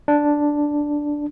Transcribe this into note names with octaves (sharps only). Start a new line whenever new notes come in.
D4